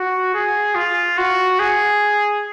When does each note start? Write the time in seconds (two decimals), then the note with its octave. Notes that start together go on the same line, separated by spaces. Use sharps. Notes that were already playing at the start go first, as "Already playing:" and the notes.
Already playing: F#4
0.34 G#4
0.75 F4
1.18 F#4
1.59 G#4